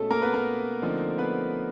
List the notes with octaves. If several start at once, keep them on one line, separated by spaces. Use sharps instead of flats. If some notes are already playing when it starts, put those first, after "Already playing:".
Already playing: B2 G#3 A3 C#4 A4
A#3 A#4
B3 B4
A#3 A#4
D3 F3 A3 C4 D#4
B3 B4